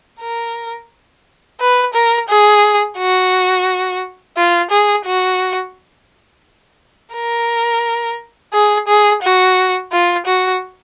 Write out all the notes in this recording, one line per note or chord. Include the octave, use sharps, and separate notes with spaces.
A#4
B4
A#4
G#4
F#4
F4
G#4
F#4
A#4
G#4
G#4
F#4
F4
F#4